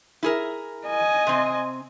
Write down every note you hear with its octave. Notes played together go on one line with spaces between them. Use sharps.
E4 G#4 A#4
D#5 G#5
C3 C4